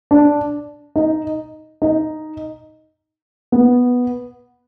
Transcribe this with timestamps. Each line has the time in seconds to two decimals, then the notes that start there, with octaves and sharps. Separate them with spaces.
0.11 D4
0.96 D#4
1.82 D#4
3.52 B3